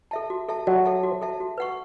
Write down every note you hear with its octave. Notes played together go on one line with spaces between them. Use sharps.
A4 E5 A5
F#4
A4 E5 A5
F#3 F#4
A4 E5 A5
F#4
A4 E5 A5
F#4
B4 F#5 C#6